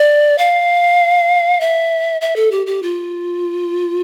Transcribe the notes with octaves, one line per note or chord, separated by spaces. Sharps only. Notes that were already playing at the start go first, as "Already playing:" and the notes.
Already playing: D5
F5
E5
E5
A4
G4
G4
F4